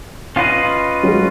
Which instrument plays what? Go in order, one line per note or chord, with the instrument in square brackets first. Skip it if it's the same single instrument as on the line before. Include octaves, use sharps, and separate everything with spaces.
[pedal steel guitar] C#4 F4 B4 D#5
[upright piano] F#3
G#3